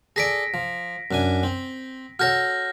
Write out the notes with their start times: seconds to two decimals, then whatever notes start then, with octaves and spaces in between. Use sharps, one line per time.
0.16 G#4 A4 D5 A#6 B6 D7
0.54 F3
1.11 F#2 D4 G#5
1.43 C4
2.19 F#4 A4 C#5 F6 G6 A#6